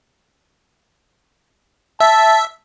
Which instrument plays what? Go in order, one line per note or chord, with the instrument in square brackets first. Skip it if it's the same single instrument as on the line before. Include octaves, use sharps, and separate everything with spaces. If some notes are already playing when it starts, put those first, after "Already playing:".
[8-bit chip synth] E5 [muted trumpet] A5